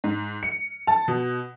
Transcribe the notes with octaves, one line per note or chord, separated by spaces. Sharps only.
G#2
C#7
A5
B2